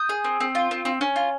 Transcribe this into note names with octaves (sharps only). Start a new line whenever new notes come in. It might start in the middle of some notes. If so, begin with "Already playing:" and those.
Already playing: D#6 G6
G#4
C4
C4
F4
C4
C4
C#4
F4